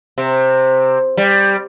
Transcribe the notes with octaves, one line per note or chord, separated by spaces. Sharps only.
C3
G3